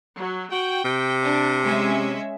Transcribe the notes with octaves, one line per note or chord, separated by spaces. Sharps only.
F#3
F#4 G5
C3
D4
G#3 C#4 E5